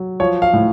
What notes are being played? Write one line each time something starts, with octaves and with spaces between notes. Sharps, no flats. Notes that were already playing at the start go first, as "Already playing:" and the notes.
Already playing: F#3
F3 C#5
F5
A2